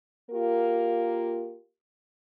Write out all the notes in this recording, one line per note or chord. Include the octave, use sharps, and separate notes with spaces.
A#3 F4 G4 A#4